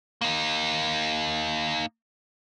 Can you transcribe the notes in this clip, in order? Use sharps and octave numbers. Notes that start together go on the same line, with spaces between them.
A#3 D#4